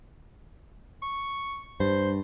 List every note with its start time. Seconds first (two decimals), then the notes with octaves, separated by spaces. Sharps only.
1.02 C#6
1.80 G2 C5